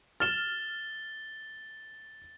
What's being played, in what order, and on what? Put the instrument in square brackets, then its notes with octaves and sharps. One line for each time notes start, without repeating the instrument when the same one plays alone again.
[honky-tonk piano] F6 E7 [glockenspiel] A6 G7